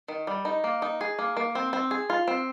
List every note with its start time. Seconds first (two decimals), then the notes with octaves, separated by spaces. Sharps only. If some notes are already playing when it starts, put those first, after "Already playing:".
0.08 D#3
0.27 G3
0.45 D#4
0.64 A#3
0.82 D#4
1.01 G#4
1.19 A#3
1.37 A#3
1.55 C4
1.73 C4
1.91 G#4
2.10 F4
2.28 C4